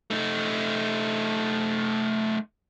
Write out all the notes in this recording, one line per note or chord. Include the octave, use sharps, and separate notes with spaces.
A3 D#4